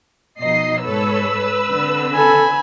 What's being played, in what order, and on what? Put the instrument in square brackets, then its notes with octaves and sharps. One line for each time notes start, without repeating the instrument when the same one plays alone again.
[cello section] B2 F3 D#4 [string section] D#5 C7
[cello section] G#2 A4 C#5 [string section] B4 E6
[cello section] D3 C4
[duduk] A4 [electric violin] G#5 B5